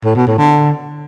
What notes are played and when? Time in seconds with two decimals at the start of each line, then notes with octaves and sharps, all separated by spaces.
0.04 A2
0.16 B2
0.27 A2
0.38 D3